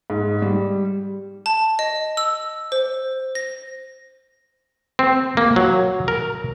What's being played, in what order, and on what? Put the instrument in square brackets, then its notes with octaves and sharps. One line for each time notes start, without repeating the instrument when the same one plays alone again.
[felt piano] G#2
G3
[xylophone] A5
D#5
E6
C5
A#6
[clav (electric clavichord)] C4
A#3
F#3
A#4